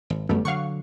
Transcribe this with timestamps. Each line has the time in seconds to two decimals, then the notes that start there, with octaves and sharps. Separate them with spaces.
0.10 G#1
0.29 G1 F#2 G3 A3 B3
0.45 D3 F#3 F5 F#5 C#6